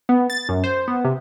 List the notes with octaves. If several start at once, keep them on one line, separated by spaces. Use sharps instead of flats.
B3
A6
F#2
C5
B3
C3